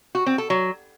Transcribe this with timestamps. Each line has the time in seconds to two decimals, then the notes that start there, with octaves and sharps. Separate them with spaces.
0.15 F#4
0.26 C4
0.38 A4
0.50 F#3